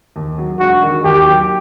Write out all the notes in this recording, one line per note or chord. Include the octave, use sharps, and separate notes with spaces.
D#2
F#3
E1 F#4
D#3
D#2 G4
F#3